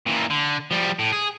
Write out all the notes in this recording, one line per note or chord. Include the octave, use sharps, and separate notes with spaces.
A#2 E3
D3
F3 G3
A2
G#4